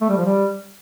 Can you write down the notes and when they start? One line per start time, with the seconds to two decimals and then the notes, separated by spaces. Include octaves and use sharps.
0.01 A3
0.09 G3
0.17 F3
0.26 G3